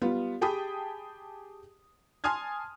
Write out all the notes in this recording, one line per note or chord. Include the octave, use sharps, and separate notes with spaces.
G3 B3 F4
G4 G#4 G5 A5 B5 D#6
G#5 A5 C6 D#6 F6 G#6